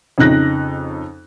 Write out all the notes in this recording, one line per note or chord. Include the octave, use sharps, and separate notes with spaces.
F2 C#3 D#4 F#6 A#6